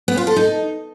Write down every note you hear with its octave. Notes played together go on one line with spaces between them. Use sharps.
B3
F4
A4
D#4